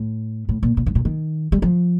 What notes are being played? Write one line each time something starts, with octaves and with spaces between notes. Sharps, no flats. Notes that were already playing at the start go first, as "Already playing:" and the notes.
Already playing: A2
A2
A#2
A#2
G2
A#2
D#3
G3
F3